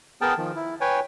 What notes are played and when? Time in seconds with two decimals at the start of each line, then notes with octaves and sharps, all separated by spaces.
0.21 B3 G#4 A#4 G5 A5
0.38 D#3 F3
0.56 E4
0.81 B4 C#5 G5 G#5